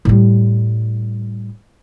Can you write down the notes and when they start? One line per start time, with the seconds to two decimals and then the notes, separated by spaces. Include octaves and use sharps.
0.05 A2 G3